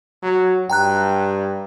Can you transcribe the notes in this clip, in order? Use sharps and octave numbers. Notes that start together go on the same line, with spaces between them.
F#3
G2 G5 A#5 F#6